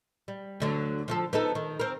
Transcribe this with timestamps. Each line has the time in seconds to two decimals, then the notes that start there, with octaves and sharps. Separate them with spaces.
0.28 G3
0.60 D2 D3 F#3
1.08 F3 F4 A4
1.33 B3 D#4 A4
1.55 D#3
1.79 C4 A#4